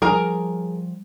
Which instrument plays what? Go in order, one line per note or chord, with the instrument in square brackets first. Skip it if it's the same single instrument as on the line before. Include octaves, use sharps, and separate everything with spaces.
[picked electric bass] F3 G3 [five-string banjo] G#4 A#4 A#5